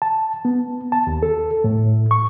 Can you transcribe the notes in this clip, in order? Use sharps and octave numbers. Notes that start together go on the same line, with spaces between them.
A5
B3
A5
D#2
A4
A2
C#6